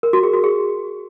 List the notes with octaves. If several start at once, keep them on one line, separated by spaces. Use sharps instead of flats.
A#4
F#4
G#4
F#4
G#4